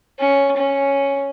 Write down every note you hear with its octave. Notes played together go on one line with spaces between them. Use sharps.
C#4
C#4